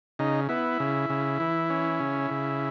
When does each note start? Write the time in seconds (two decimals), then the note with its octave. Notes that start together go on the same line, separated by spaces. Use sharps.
0.19 C#3 D#4
0.49 B3 E4
0.80 C#3
1.10 C#3
1.40 E3
1.70 C#4
2.00 C#3
2.31 C#3